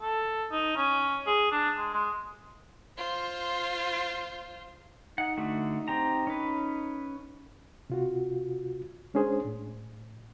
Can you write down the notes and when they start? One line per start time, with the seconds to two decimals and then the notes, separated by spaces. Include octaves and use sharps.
0.01 A4
0.51 D#4
0.76 C#4
1.27 G#4
1.51 D4
1.78 G#3
1.94 G#3
2.98 F4 C5
5.18 D#4 F#5
5.37 D3 A3 F#4
5.88 C4 G4 A#5
6.27 C#4 B4
7.90 C3 F4 F#4
9.14 G#3 C#4 D4 G#4 C5
9.45 A2